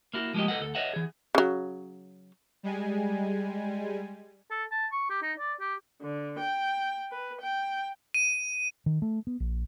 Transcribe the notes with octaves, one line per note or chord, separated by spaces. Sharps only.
A#3 E4 F#4
F3 G#3 A#3 G4 D#5
A4 B4 D#5 F#5
D2 A4
B4 C#5 D#5 E5 F#5
E3 G#4
C#3 F#3
G3 G#3 G#5
A4
A5
C#6
G4
D#4
D5
G4
D3
G5
B4
G5
D#7
D#3
A3
B3
A#1